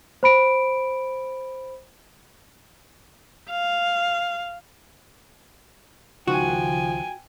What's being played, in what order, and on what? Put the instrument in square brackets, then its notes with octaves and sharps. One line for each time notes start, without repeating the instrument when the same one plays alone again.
[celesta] C5 B5 D7
[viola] F5
[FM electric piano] C#2 D#3 F#6 [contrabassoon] F3 [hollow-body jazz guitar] F#4 [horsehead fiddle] G5 G#5